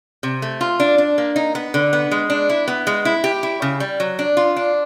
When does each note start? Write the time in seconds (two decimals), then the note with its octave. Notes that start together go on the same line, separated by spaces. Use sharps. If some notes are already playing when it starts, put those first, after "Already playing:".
0.23 C3
0.42 A3
0.61 F4
0.80 D4
0.98 D4
1.18 A#3
1.36 D#4
1.55 B3
1.74 D3
1.93 B3
2.11 G#3
2.30 D4
2.50 E4
2.68 B3
2.87 G#3
3.05 E4
3.24 G4
3.43 E4
3.62 C#3
3.80 G3
4.00 F#3
4.19 D4
4.37 F4
4.56 D4